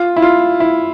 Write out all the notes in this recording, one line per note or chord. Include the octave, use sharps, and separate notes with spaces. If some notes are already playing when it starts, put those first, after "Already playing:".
Already playing: F4
E4
F4
E4